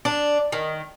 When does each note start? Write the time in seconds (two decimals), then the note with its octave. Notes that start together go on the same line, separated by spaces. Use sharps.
0.05 D4
0.52 D#3